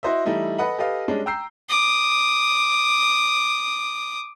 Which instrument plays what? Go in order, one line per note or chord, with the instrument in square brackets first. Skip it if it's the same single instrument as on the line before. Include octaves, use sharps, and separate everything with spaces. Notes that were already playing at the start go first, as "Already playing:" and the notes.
[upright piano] E4 F#4 C5 D#5 E5
E3 G3 A3 D#4 E4
A4 B4 D#5 F#5 B5
G4 A4 B4 D#5 F5
G3 G#3 C#4 D4
G5 A#5 E6 G6 C7
[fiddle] D6 D#6